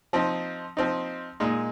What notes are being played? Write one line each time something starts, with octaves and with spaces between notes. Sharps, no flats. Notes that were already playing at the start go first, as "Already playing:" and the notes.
F3 C4 D#4
F3 C4 D#4
A#2 G#3 D#4